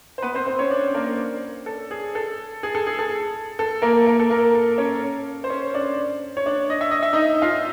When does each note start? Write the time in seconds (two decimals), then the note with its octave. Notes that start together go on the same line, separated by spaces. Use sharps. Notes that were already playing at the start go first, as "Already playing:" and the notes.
0.18 C5
0.22 B3 B4
0.34 C4 C5
0.46 C4 C5
0.59 C#4 C#5
0.71 D4 D5
0.94 A#3 A#4
1.66 A4
1.91 G#4
2.15 A4
2.63 G#4
2.75 A4
2.87 G#4
2.99 A4
3.59 A4
3.82 A#3 A#4
4.07 A#3 A#4
4.20 A4
4.30 A#3 A#4
4.54 A4
4.78 C#4 C#5
5.44 C5
5.50 C#4 C#5
5.74 D4 D5
6.37 C#5
6.46 D4 D5
6.70 D#5
6.81 E5
6.91 D#5
7.03 E5
7.13 D#4 D#5
7.42 F4 F5